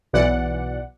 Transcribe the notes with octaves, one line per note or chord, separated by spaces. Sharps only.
B1 B2 E3 D5 F#5